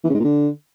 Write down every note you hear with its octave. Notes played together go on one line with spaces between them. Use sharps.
E3
C#3
G#2
A#2
D3